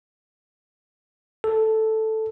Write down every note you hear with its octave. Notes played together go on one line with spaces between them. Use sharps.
A4